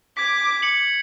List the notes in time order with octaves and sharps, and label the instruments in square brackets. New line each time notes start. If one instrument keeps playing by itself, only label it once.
[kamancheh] D6 [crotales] G#6 B6
[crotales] C#7 F#7